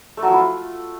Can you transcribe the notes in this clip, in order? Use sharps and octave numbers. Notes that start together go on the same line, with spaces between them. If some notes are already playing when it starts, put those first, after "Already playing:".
A3
F#3
F3
E4
F4